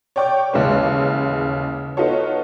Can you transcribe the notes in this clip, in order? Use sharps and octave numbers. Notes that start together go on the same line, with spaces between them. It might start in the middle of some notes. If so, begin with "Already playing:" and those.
C#5 D5 G5 C#6 D6
A1 D#2 C#3 G#3 C#4 B4
B3 D#4 F4 F#4 A4 C#5